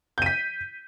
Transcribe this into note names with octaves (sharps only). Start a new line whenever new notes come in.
G6 B6 D#7